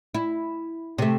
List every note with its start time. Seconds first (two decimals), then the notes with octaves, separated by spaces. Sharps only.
0.14 E4
0.98 C3 A3